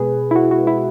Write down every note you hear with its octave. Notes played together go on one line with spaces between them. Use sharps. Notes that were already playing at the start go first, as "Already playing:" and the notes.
Already playing: B2 G#3 G#4 B4
E4
F#4
F#4
E4